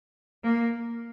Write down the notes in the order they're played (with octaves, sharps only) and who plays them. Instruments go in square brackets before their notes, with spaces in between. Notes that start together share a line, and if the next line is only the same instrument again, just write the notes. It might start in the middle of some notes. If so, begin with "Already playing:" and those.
[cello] A#3